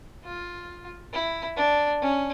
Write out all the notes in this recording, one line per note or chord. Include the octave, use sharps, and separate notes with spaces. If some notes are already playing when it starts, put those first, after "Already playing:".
F4
E4
D4
C#4